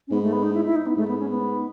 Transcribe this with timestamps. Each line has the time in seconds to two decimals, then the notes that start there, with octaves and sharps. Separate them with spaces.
0.08 C#4
0.11 G#2 B3
0.23 A3
0.32 B3
0.43 D#4
0.54 E4
0.65 E4
0.76 D#4
0.87 B3
0.97 G#2 A3
1.08 B3
1.19 C#4
1.29 B3